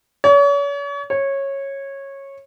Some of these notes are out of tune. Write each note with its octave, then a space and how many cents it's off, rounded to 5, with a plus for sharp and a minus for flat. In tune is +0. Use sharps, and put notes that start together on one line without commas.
C#5 +40
C#5 -15